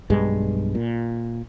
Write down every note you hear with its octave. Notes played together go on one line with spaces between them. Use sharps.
B1 G2 G#3
A#2